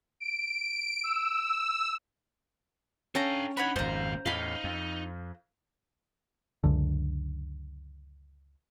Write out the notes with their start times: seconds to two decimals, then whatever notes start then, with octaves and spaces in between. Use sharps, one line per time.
0.20 D7
1.03 E6
3.15 C#4 D4 A4 F5 G5 A#5
3.57 D4 D#4 C#5 F#5 B5
3.76 G#1 F2 A#2 C5 F5 A#5
4.26 E2 A2 D#4 D#5 F5 B5
4.64 F2
6.64 C#2 F#2 D3